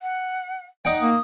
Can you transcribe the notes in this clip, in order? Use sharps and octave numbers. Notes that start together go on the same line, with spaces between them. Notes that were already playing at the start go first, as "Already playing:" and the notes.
F#5
D#4 D5 F#5 G5
A#3 D#6